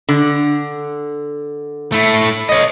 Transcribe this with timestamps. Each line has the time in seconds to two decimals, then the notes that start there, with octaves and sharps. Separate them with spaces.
0.09 D3
1.92 A3 E4
2.49 C#5 D#5